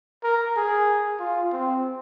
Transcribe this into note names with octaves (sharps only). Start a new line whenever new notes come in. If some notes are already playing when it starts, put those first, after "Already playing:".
A#4
G#4
F4
C4